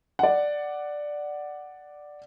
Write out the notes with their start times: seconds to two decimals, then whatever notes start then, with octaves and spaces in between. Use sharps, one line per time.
0.19 D5 F#5